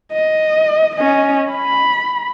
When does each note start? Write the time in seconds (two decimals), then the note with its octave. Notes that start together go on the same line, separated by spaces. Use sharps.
0.12 D#5
0.96 C#4 D#5
1.51 B5